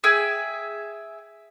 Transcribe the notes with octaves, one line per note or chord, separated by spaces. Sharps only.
G#4 E5 G5 G#5